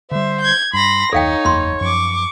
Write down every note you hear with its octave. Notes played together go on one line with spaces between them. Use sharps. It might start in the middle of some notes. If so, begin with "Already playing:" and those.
D3 G3 C5 E5
G6 G#6
G2 B5 C6 A#6
F#1 D#2 D#4 A4 C#5 F5 G5
F#1 E2 A#3 B5 C6
F#2 F3 C#6 D6